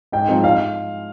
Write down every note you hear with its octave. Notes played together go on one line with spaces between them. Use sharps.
G#2 G5
F3 G#3 C4 D#4
F5